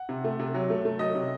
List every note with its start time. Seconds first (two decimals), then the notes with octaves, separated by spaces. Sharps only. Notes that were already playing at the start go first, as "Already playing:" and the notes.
Already playing: F#5
0.09 C3
0.24 A3
0.40 C3
0.54 F#3
0.70 A3
0.85 A3
0.99 F#3 D#5
1.15 C3